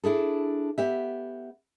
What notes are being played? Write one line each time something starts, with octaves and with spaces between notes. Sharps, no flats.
D4 E4 G#4 A4
B3 G4 E5